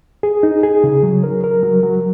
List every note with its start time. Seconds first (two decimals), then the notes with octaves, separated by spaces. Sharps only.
0.23 G#4
0.43 D#4
0.63 G#4
0.84 C#3
1.03 F#3
1.24 A#4
1.44 A#4
1.63 F#3
1.83 F#3